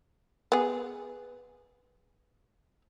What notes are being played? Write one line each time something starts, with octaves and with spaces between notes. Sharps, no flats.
B3 G#4